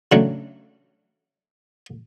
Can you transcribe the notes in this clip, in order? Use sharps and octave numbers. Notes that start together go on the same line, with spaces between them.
C#3 F#3 A3 D4